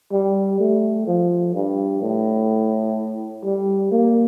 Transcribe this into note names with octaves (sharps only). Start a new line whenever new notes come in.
G3
A3
F3
G2
A2
G3
A#3